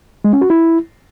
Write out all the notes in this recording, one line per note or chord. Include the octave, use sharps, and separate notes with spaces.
G#3
C#4
F#4
E4